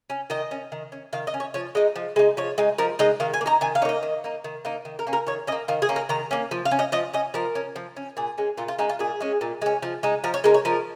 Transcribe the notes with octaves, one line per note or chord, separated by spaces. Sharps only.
C#4
D#3 D#5
C#4
D#3
C#4
D#3 F5
D#5
C#4
C#5
F3 C#5
G#3 D#4 D#5
F3
G#3 D#4
F3 C#5
G#3 D#4
F3 A#4
G#3 D#4 D#5
D#3 F5
G#5
A#3
D#4 A#5
D#3 G#5
F5
A#3 D#4 C#5 D#5
D#3
A#3 D#4
D#3
A#3 D#4
D#3
A#4
A#3 C#4
A#4
D#3 C#5
C#4 D#5
A#3
D#3 F4
G#4
A#3 C#4
A#4
D#3 A#5
A#3 C#4
F3
F5
C#4
D#5
F3 D#5
C#4 D#5
F3 A#4
C#4
F3
C#4
A#2 G#4
G#3 C#4
A#2 F4
F4
G#3 C#4 D#4
F4
A#2 G#4
G#3 C#4
A#2
G#3 C#4
F3
G#3 D#4
F3 A#4
C#5
G#3 D#4 A#4
C#5
F3 A#4